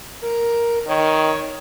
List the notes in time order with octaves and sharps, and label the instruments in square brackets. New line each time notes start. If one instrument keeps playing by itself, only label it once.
[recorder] A#4
[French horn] D#3 [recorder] C#5